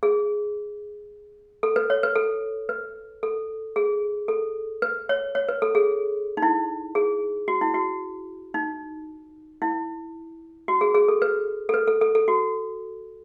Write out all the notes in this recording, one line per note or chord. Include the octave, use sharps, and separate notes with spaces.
G#4
A4
B4
C#5
B4
A4
B4
A4
G#4
A4
B4
C#5
C#5
B4
A4
G#4
D#4
E4
G#4
F#4
E4
F#4
D#4
E4
F#4
G#4
G#4
A4
B4
A4
B4
A4
A4
A4
F#4